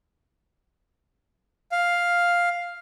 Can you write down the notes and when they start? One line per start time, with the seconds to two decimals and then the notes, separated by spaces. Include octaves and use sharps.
1.72 F5